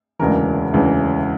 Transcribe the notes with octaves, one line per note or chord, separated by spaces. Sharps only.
E1 D2 C#3 E3 A#4
E1 D2 C#3 E3